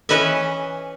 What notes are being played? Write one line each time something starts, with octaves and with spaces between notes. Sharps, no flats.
E3 C#4 B4 D#5 E5